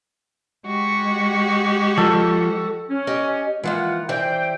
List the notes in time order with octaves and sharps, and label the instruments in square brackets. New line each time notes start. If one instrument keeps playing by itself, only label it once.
[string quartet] G#3 F#4 G4
[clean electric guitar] F3 [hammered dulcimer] A4
[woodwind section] C#4
[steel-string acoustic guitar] G4 D#5 G#5
[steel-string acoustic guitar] E3 F3 A#3 [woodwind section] G#3 F4 F#5
[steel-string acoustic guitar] E3 G3 C5 [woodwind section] G5